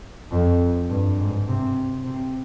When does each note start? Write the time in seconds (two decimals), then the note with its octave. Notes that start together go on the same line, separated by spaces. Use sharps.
0.31 F2
0.90 G2
1.19 G#2
1.48 C3
2.05 C3